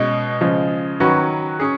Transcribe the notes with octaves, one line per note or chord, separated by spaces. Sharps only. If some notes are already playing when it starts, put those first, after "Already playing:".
Already playing: B2 G#3 C#4
C#3 F3 G#3
D#3 F#3 C#4 F#4 B4
C#4 G#4